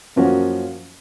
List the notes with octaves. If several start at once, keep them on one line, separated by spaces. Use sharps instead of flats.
F#2 F3 A#3 C#4 F#4